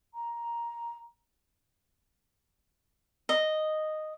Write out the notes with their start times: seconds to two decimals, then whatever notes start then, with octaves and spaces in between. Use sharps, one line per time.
0.14 A#5
3.29 D#5